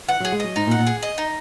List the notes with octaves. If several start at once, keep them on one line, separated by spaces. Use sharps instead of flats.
E3 F#5
F#3 G#4
G#3
F#3 D#5
G#2 D#4
A#2
F#5
A#2
G#4
D#5
D#4